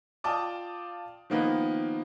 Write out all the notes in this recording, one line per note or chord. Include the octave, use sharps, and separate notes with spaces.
F4 D5 G5 A5 D6 D#6
D#3 F3 A#3 B3 D#4